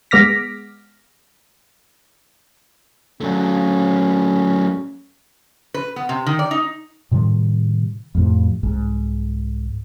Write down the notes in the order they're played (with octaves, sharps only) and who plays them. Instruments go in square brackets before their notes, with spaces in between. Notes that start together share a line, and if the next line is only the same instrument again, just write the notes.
[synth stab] G#3 B3 D6 F6 A#6 B6
[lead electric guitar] F#3 A3 [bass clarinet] C#4
[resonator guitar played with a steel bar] B4
B3
C3
D#3
D5
D#4
[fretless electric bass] A2 C3 D#3 G3
F2 A2 C3
C2 G#2